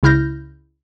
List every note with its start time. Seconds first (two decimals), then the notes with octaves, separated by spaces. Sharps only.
0.03 C#2 C#3 E4 F6 G6 A#6